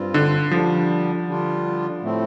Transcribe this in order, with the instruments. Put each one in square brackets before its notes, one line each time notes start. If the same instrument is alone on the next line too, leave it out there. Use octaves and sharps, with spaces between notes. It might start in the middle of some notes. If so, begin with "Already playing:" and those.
Already playing: [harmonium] G2 G3 C4 F4
[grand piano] D3
[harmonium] D3 G3 D4 [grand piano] F3
[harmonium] D3 G3 D4 F4
A2 A3 C4